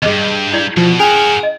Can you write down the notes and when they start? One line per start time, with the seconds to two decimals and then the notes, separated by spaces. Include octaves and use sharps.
0.03 E2 G2 G#4 D#5
0.21 G6
0.53 E4 D5
0.77 B2 F3
1.00 C#4 F#4 G#4 A#4 D7
1.43 D#5